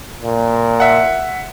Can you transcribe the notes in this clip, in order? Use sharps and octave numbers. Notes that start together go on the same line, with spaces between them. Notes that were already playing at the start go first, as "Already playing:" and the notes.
A#2
E5 F#5